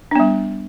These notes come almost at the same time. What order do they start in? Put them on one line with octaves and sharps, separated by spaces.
D4 B3 G3